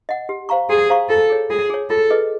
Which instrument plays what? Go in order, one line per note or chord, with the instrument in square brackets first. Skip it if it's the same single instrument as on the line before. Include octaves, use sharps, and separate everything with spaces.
[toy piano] D#5 F#5
G4
C5 F5 A#5 C#6
[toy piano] G4 [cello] G#4
[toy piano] C5 F5 A#5 C#6
[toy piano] F4 [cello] A4
[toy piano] G#4 C#5
[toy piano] F4 [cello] G#4
[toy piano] G#4 C#5
[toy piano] F4 [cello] A4
[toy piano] G#4 B4 D#5